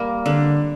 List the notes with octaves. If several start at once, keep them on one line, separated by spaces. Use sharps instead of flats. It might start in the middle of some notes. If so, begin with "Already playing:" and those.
Already playing: G3 A#3
D3